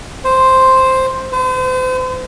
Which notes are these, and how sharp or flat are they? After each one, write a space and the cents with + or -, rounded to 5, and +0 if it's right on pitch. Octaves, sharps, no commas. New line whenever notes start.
C5 +0
C5 -40